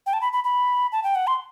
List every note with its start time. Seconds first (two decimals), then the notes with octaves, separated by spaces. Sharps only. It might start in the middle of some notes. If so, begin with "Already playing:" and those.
0.06 G5
0.13 A5
0.21 B5
0.33 B5
0.44 B5
0.92 A5
1.04 G5
1.15 F#5
1.27 C6